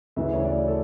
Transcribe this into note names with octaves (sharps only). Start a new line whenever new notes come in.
D2 C#3 E3 E5
C#5
D5
A4